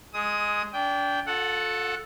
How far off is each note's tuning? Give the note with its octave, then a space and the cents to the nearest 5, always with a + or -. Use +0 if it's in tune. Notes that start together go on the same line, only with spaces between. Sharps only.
G#3 +0 D#6 +20
D4 -30 G5 +0
F4 +35 A4 +0 F#5 +0